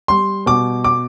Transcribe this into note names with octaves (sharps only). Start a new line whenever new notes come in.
G3 C6
B2 D6
D6